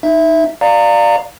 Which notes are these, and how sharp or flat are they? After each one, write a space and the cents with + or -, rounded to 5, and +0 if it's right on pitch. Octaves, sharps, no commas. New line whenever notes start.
D#4 +0 E5 +0
D5 +15 F5 +0 A#5 -25